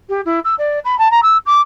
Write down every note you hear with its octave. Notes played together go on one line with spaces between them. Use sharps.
G4
E4
E6
D5
B5
A5
A#5
E6
D6